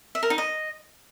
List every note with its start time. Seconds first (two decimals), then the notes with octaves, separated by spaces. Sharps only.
0.15 E5
0.23 A#4
0.30 D#4
0.38 D#5